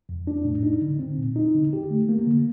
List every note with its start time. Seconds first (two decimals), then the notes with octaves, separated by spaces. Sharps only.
0.09 F2
0.27 D4
0.45 A2
0.63 D#4
0.82 D3
0.99 C4
1.18 A#2
1.36 D#4
1.55 D3
1.73 G4
1.90 A3
2.09 A#3
2.27 D3